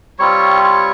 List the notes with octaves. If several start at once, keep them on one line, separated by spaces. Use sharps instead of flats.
G3 C4 F4 C#5 C#6
C#5 C#6